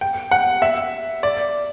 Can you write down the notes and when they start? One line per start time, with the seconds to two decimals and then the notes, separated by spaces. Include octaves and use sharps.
0.01 G5
0.31 F#5
0.62 E5
1.23 D5